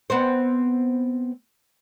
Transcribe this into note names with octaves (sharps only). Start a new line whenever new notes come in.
B3 C4 C5